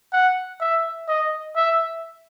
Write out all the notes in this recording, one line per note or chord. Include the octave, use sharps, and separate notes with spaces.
F#5
E5
D#5
E5